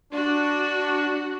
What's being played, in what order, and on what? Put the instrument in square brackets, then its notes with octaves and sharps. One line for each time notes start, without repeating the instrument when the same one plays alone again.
[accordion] D4 [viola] F#4